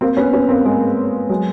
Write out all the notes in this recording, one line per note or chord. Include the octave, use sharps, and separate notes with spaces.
A#3 C4
B3 C#4
B3 C#4
A#3 C4
G#3 A#3
F#3 G#3